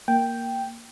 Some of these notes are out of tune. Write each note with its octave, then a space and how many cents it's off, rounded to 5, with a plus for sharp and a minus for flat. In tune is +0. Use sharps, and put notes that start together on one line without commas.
A#3 +0 G5 +0